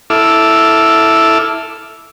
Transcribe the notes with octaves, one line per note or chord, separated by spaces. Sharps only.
E4 A4 D6 E6 F6